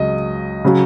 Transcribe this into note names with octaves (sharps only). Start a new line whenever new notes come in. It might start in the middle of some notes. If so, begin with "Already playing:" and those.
Already playing: C#2 C#3 F#3 D#5
C#3 F#3